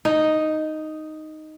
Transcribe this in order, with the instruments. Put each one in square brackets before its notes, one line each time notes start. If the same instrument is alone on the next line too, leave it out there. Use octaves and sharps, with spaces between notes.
[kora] D#4